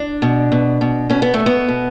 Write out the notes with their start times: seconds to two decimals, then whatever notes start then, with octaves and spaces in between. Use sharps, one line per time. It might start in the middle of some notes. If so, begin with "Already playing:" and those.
Already playing: D4
0.22 B2
0.52 B2
0.81 B2
1.10 B2 C#4
1.22 B3
1.34 A3
1.40 B2
1.46 B3
1.68 B2